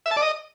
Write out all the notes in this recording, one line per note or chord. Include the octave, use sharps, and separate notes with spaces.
E5
A5
D5
D#5